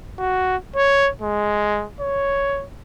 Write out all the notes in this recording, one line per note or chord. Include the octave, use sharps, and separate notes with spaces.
F#4
C#5
G#3
C#5